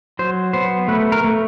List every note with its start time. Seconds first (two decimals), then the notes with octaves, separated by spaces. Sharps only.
0.19 F#3 C5
0.53 B3 C5
0.88 A3 B4
1.12 A#4
1.24 A3